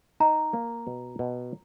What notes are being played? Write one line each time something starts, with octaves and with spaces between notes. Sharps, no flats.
D#4 A#5
A#3
B2
B2